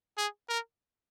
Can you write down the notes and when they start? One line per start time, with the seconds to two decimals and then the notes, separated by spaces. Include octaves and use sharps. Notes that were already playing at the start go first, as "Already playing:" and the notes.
0.17 G#4
0.49 A#4